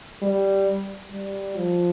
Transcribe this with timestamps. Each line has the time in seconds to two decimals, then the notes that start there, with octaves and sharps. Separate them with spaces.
0.22 G3
1.11 G3
1.57 F3